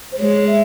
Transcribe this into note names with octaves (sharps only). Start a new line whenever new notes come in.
C5
G#3 C#5
E5